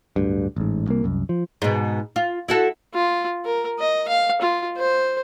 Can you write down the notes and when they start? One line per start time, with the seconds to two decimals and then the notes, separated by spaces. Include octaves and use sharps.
0.16 D1 D2 G2
0.56 A1 G#2
0.87 C2 A#3
1.04 C2 F#2
1.29 F3
1.62 G#2 B2
2.16 F4
2.48 E4 F#4 A4
2.94 F4
3.45 A#4
3.79 D#5
4.08 F5
4.42 F4
4.77 C5